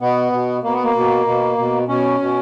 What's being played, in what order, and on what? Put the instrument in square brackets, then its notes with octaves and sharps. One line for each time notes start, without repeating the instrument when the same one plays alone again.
[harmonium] B2 B3
B2
B2 A#3
B3
A#3
B2
B2
B2
B2 C#4
B2